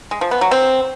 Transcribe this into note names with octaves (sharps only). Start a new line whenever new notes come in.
G#3
F3
B3
F#3
C4